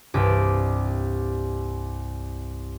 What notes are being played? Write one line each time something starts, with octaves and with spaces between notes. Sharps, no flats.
C2 G2 D6